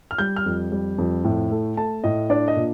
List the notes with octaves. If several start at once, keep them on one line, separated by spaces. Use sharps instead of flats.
F6
G3 G6
F6
F2
G3
F2
A2
A3
A3 A5
A2 D#5
D4 D5
D#5
A#2